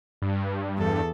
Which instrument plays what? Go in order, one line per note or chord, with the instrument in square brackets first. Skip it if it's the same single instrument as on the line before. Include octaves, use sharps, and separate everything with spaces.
[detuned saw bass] G2
[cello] E2 A4